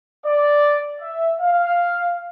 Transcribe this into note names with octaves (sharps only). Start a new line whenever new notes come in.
D5
E5
F5